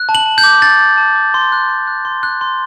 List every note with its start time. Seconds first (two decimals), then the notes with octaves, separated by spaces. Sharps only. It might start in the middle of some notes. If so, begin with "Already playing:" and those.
Already playing: F#6
0.09 A5
0.15 F#7
0.26 A5
0.38 G6
0.44 D6
0.62 F#6 A6
0.80 A5
0.97 A5
1.15 D6
1.34 C6
1.52 F#6
1.69 C6
1.87 F#6
2.05 C6
2.23 F#6
2.41 C6